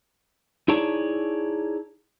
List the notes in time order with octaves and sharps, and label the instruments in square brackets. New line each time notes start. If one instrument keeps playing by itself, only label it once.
[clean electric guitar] D#4 E4 G#4 C#5 D5 A5